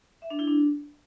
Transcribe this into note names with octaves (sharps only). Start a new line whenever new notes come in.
E5
D4
E4
D4